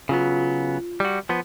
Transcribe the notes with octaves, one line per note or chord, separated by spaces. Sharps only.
C#3 F#3 B3 F4
G3 F#4
F3 B3